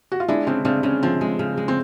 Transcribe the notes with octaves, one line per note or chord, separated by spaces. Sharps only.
F#4
F4
G#3 D4 E4
C#3 C4 D4
C#3 C4 D4
C#3 C#4
F3 C4
G#3
C#3
G#3
C4